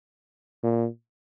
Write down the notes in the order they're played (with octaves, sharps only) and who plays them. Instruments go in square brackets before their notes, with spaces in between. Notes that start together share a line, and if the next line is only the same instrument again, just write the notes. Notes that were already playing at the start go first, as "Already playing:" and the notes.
[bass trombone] A#2